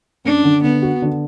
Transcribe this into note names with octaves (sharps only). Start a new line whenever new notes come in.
F#2 D4
D3
D3 B3
F#4
D3